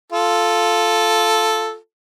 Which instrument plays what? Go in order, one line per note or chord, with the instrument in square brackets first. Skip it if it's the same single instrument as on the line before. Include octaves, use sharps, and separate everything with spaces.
[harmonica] F4 A4